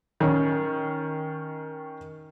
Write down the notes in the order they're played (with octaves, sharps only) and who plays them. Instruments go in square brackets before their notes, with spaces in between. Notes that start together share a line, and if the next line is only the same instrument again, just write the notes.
[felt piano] D#3 C#4